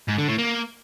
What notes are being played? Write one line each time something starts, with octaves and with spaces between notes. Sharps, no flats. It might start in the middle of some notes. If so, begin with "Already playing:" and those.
G#2
D3
A2
A#3